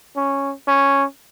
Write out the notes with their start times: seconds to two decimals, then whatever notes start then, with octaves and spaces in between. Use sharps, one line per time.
0.16 C#4
0.68 C#4